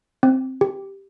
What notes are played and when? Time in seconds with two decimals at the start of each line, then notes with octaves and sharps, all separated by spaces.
0.23 C4
0.61 G4